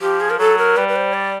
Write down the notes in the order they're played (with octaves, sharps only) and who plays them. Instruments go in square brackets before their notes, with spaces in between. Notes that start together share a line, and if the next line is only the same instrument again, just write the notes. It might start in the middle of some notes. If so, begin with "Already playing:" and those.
[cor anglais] F3 [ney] G4
[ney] G#4
A#4
[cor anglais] F#3 [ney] A4
[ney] A#4
[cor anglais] G3 [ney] B4
[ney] B4
C5
D5